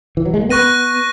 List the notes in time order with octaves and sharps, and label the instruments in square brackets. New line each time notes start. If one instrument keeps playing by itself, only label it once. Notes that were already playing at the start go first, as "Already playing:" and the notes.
[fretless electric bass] E3
F#3
G#3
A#3
[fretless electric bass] B3 [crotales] C#6 F#6 A#6 D#7